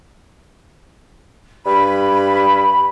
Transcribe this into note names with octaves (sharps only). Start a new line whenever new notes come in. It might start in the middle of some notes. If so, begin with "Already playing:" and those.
G2 B5